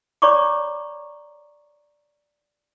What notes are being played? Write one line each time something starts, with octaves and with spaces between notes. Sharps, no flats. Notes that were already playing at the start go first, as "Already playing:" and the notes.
C#5 D5 A#5 B5 C#6 D6